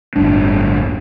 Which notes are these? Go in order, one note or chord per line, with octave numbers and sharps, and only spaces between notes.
D1 G1 D4